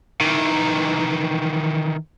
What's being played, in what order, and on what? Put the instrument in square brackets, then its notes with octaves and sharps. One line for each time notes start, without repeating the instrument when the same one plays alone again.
[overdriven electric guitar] D#3 E3